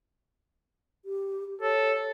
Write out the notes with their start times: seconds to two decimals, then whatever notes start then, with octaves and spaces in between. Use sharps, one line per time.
1.05 G4
1.61 A4 C#5